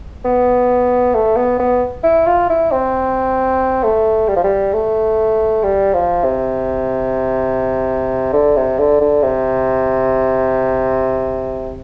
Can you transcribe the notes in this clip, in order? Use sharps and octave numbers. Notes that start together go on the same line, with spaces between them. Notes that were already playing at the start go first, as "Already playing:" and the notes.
B3
A3
B3
B3
E4
F4
E4
C4
A3
G3
F3
G3
A3
G3
F3
C3
D3
C3
D3
D3
C3